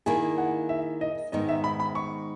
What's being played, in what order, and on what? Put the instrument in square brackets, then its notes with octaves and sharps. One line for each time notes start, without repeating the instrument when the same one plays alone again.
[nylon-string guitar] D#3 A#3 E4 G#4 [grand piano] G#5
[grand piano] F#5
E5
D#5
[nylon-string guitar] G#2 D#3 G#3 B3 D#4 [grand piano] D#5
[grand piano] E5
B5
B5
C#6